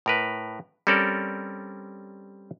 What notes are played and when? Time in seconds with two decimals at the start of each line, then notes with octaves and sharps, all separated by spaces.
0.06 A2 A#4 B4
0.87 G3 C4 C#4 A4 A#4 D5